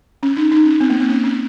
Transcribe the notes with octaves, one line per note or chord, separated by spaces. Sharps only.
C#4
D#4
D#4
C#4
C4
A#3
C4
C#4
C#4